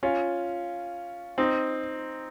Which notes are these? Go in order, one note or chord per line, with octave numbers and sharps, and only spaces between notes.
C#4 F4
C4 D#4